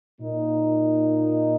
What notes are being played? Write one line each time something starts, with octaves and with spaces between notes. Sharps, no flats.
A#2 A#3 D#4